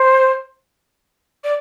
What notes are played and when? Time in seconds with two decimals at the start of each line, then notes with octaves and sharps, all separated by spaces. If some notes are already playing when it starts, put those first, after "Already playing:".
Already playing: C5
1.44 D5